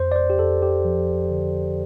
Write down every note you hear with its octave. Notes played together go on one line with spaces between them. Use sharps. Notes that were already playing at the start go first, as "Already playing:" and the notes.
Already playing: F2 C5
D5
C5
G4
F2 A4
G4
F3
D3